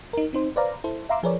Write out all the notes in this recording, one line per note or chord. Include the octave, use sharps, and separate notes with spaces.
D#4 A#4
C4 D#4 C5
B4 C5 D5 F5 A#5
E4 A4 C5
E5 F5 A#5 C6 D6 E6
F3 G#4 A#4 B4 C#5 D5